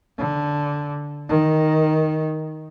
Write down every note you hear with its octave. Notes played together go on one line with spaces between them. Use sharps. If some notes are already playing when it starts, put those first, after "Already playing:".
D3
D#3